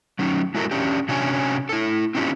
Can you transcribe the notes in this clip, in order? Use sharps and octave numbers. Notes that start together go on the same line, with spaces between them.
F#3 C#4 D#4
G#3 E4 F#4 A4 A#4
C#4 D4 G4
C3 C#4 D4 F#4 C#5 G#5
E4 A4
C4 C#4 D#4 F4 G4